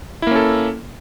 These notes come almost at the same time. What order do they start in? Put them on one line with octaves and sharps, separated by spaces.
E4 A#3 C#4 A4